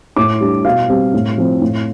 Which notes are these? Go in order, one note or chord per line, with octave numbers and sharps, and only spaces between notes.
A2 D6
G3 D4
B2 F5
G3 C4
A2
F3 C4
A2